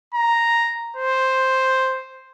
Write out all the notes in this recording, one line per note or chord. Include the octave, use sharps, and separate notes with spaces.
A#5
C5